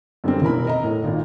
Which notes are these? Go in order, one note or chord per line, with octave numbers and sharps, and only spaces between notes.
F#2 D3 G3 A#3 C4
E1 E4 A#4 B5
A#4 D#5 A#5
A2
G#1 A#2